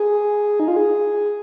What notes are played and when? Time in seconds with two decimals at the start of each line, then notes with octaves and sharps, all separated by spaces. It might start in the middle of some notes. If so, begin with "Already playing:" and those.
Already playing: G#4
0.60 D#4
0.68 F4
0.76 G#4